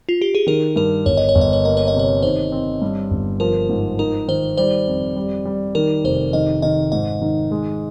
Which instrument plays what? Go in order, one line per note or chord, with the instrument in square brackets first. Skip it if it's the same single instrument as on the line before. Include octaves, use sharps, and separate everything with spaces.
[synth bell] F4
G4
G#4
[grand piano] D#3 [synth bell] A#4
[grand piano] G2 [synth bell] A#4
[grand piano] G1 [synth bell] C#5
[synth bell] D#5
C#5
[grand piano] G1
[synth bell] D#5
C#5
[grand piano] A#3 [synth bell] D#5
[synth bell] C#5
D#5
[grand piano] C3
[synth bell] C#5
[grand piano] D#3 [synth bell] C5
[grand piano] C4
G2
G1
[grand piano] F3 [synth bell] A#4
[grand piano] G#2
[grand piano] D#4 [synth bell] A#4
[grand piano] D#3 [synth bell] C5
[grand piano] G3 [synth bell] C5
[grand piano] F2
G3
G3
[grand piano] D#3 [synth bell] A#4
[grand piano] F1 [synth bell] C5
[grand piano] D#3 [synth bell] D#5
[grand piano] D#3 [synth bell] D#5
[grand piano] G#2 [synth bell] D#5
[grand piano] D#3
G#3